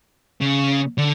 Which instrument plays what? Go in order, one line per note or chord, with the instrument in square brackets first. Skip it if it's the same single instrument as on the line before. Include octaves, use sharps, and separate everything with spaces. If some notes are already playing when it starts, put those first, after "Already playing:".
[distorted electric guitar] C#3
D3